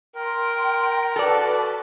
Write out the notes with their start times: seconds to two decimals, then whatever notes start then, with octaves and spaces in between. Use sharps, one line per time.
0.16 A#4 G5 C6
1.16 F#4 A4 B4 D5 A5